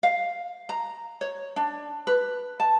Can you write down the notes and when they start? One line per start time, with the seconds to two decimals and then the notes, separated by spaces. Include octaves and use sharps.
0.03 F5
0.69 A#5
1.21 C#5
1.56 D4
2.07 B4
2.60 A5